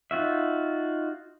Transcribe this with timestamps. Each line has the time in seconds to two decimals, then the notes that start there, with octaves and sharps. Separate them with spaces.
0.11 D#4 F4 F#4 E5